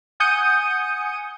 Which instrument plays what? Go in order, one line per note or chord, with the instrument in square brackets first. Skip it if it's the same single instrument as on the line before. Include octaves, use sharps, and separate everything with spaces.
[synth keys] F#5 G#5 D#6 G6 C#7 D#7